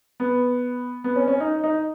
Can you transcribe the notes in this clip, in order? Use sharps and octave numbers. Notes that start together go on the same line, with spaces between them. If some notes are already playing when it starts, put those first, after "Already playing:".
B3
B3
C#4
C#4
D#4
D#4